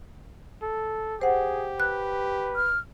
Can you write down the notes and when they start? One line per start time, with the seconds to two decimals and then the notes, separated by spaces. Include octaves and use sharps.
0.62 A4
1.21 G4 G#4 C5 F#5
1.80 B4 F#6
2.56 F6